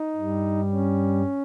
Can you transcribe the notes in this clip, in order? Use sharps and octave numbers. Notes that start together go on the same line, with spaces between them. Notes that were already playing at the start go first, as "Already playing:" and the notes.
Already playing: D#4
G2
G3
C#4